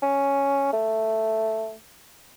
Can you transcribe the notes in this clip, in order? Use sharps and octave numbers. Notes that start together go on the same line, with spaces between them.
C#4
A3